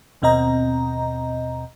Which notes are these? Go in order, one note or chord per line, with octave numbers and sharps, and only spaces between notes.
D#2 B2 C4 D#5 A#5